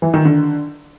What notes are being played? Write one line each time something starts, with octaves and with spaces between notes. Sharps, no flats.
E3
D#3
D3